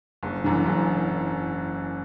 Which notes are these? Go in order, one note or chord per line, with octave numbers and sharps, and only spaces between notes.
F#1
F#2 E3
F#1